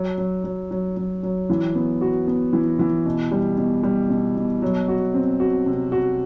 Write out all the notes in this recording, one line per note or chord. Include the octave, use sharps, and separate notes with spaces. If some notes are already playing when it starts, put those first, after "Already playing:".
Already playing: F#3
F#3
F#3
F#3
F#3
F#3
E3
B3
F#4
B3
E3
E3
B2
G3
B2
G3
B2
B2
F#3
F#4
C4
F#4
C3
F#4